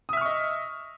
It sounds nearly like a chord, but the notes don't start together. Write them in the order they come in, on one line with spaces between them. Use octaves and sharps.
D#6 E5 F6 C#6 D#5